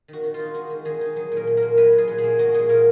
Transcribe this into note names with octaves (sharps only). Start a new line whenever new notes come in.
D#3 F#4
D#3
F4
D#4
G#3 F#4
D#3
D#3 G#4
D#4
F#3 G#4
A#2
A#4
A#2
A#4
A#3
F#3 B4
A#2
G#4
A#2
G#4
A#3
G#3 F#4
A#2 G#4
A#2 A#4